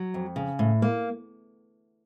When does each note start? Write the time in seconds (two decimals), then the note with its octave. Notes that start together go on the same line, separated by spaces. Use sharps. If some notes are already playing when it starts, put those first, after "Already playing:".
Already playing: F#3
0.14 F2
0.36 C#3
0.59 A2
0.82 A#3